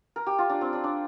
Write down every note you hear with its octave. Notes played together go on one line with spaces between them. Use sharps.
A#4
G4
F4
D4
C4
D4
D4